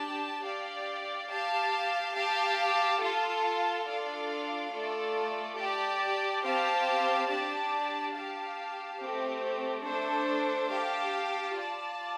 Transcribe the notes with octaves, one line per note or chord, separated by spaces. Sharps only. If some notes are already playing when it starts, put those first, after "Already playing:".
Already playing: D4 G4 D5 A5
G4 D5 F5
G4 F5 A5
G4 F5 A5
F4 A4 F5 A5
D4 F4 A4 D5 F5
A3 F4 A4 D5
G4 D5 A5
C4 G4 F5 A5
D4 G4 D5 A5
G4 F5 A5
A3 C4 G4
A3 D4 A4 C5
G4 F5 A5
F4 D5 A5